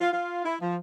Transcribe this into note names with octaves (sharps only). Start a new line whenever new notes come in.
F4
F4
E4
F3